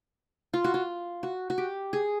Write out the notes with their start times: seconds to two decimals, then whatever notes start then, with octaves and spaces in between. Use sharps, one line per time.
0.53 F4
0.64 F#4
0.74 F4
1.23 F#4
1.50 F#4
1.58 G4
1.93 G#4